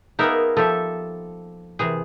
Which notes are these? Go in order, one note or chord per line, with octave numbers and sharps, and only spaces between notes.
A#3 B3 D#4 G#4 A#4 E5
F3 G4 A4 E5
C3 E3 G#4